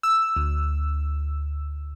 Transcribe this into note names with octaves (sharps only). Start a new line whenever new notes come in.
E6
D2